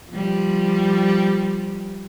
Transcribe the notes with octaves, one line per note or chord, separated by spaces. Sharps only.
F3 G3